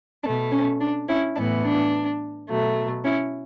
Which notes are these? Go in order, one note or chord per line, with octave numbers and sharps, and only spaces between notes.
B2 A3 D4
C#4
D4
C#4 E4
A2 E3 B3 D4
D4
B2 F#3 A3
C#4 E4